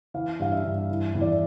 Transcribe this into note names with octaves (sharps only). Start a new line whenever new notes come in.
E3 F5
G2 F5
E5
G2
E3
E2
D5
E5